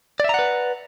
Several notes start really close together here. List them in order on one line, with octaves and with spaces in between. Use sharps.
D5 E5 A#5 F#5 B4